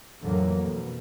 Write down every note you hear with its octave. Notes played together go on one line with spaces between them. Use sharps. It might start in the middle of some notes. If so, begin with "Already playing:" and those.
F2 A2 D3 E3 F#3 A#3
F2 B2